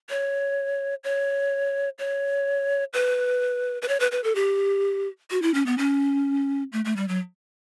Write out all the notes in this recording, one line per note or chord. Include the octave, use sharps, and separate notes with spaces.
C#5
C#5
C#5
B4
B4
C#5
B4
B4
A4
G4
F#4
E4
C#4
B3
C#4
A3
A3
G3
F#3